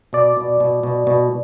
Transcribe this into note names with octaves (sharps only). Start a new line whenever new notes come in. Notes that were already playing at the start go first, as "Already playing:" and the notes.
B2 D5
B2
B2
B2
B2